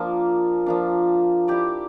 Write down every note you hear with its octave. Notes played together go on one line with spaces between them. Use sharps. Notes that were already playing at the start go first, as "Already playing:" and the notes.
Already playing: F3 A#3 D4
F3 A#3 D4
E4 G4 D5